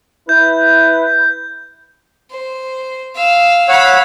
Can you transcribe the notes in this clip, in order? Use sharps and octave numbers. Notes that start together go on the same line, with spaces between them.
E4 B4 G6
C5
F5 E6
C#5 F5 F#5 B5 E6